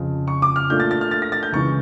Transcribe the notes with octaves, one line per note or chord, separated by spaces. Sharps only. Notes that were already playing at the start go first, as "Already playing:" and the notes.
Already playing: F2 C#3 F3
C#6
D6
F6
A#2 A3 D4 F4 G6
A6
A6
F6
A6
A#6
A6
G6
C#2 C#3 E3 C#6